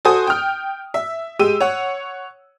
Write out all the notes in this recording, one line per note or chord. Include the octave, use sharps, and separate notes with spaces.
F#4 A4 C5 G#5 D#6
G5 F6
E5
G#3 G4 E6 D#7
C#5 F#5